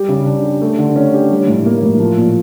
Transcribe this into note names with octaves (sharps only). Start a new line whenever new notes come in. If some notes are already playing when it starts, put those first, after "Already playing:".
Already playing: G3 G4
C#3
D4
G4
A3
D3
C#4
G4
G3
A2
A#3
A2
F3
A#2